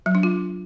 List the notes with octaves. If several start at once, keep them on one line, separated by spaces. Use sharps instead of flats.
F#3
D4
F4